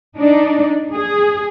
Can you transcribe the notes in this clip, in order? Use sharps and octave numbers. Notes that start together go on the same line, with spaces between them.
D4 D#4
G#4